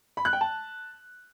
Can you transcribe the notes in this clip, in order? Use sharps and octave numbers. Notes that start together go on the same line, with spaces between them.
B5
F#6
G5
A5